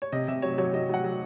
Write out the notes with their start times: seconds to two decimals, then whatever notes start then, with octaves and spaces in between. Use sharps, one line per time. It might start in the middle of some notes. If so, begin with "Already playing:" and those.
0.02 C#5
0.12 C3 D#5
0.28 C3 E5
0.42 F#3 C#5
0.58 F#3 C#5
0.73 F#3 D#5
0.89 F#3 F#5
1.04 F#3